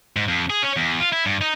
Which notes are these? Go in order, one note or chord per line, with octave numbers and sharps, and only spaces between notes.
G#2
F2
G#4
C#4
E2
F4
E4
G2
D#4